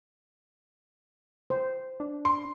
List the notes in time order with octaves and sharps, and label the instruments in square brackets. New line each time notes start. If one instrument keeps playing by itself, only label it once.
[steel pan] C5
[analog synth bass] D4
[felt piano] C6